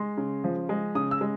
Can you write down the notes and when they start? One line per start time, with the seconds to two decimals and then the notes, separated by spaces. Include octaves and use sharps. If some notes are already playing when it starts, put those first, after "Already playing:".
Already playing: G#3 C6
0.17 C#3
0.44 F3
0.69 G#3
0.95 C#3 D#6
1.11 E6
1.21 G#3